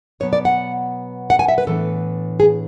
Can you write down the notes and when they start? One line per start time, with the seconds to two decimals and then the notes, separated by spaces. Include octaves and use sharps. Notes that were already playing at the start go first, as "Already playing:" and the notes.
0.20 B2 F#3 B3 C#5
0.33 D5
0.45 F#5
1.30 F#5
1.39 G#5
1.48 E5
1.58 B4
1.67 A2 E3 B3 D4 A4
2.40 G#4